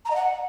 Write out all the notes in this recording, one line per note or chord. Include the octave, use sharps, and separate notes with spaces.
A#5
D#5
F#5